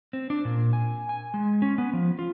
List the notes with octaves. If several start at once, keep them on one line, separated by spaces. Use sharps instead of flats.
C4
D4
A#2
G#5
G#5
G#3
C#4
B3
F3
F4